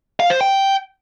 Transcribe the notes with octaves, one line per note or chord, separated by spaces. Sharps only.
F5
C5
G5